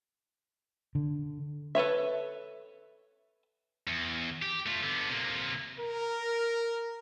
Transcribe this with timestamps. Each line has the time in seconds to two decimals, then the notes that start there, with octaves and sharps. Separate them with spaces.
0.95 D3
1.75 A4 B4 C#5 E5
3.87 E2
4.42 G4
4.66 A3 F4
4.83 D3 B3
5.09 C3 A#3
5.79 A#4